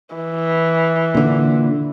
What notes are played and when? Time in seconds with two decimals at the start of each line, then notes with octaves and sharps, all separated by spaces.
0.15 E3
1.14 A#2 D3